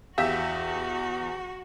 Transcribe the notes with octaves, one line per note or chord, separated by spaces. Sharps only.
E2 F#4 G4 E5 F5